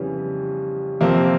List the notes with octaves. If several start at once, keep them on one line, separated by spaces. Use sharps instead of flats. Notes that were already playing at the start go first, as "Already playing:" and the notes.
Already playing: F2 C#3 E3 G3 B3 C#4
F2 C3 F3 A#3 C4